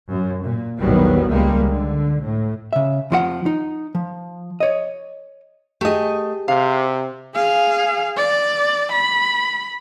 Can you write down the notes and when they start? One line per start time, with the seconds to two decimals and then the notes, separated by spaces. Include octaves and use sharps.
0.11 F#2
0.44 A#2
0.78 A#1 E2 D#3 F#3 G3 B3
1.29 C#2 G3 G#3 A#3
1.65 D3
2.22 A2
2.73 C#3 E5
3.11 F2 F3 F4 F#5
3.46 D#4
3.95 F3
4.60 C#5 D#5
5.81 A3 G4 G#4 D#5
6.48 C3 F5
7.35 G#4 F5
8.17 D5
8.92 B5